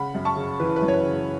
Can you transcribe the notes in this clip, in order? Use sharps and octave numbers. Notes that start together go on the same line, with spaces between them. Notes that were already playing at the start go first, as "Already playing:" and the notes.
Already playing: C#3 F#5 B5
F#2
A5 C#6
C#3
E3 B4
B4
F#2
C#5
B4
C#3